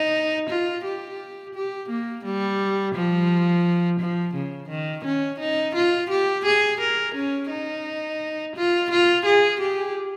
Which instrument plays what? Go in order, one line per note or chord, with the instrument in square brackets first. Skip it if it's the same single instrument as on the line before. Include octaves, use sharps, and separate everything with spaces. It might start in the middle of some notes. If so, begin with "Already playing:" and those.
Already playing: [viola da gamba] D#4
F4
G4
G4
A#3
G3
F3
F3
C#3
D#3
C#4
D#4
F4
G4
G#4
A#4
C#4
D#4
F4
F4
G#4
G4